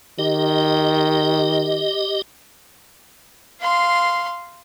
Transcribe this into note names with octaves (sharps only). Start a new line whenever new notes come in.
D#3 G4 D#5
F5 C6